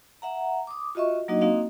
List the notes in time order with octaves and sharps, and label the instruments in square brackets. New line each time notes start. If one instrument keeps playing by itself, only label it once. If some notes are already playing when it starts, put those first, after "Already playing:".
[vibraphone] E5 F#5 A#5
D6 D#6
F4 F#4 D#5 E5 C#6
F#3 A#3 D4 D#4 F#4 D#5
A#3 C4 D#4 F#4 D#5 F5